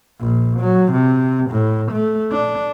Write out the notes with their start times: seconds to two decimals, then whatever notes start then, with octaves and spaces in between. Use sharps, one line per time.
0.20 A#1
0.60 F#3
0.92 C3
1.50 A2
1.92 A3
2.32 D4